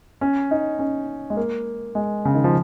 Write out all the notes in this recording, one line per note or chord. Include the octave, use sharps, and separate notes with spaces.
C#4
D#4
C#4
G#3
A#3
G#3
C#3
D#3
F3